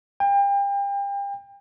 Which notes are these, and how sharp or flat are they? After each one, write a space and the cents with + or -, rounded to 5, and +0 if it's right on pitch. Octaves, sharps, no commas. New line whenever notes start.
G5 +35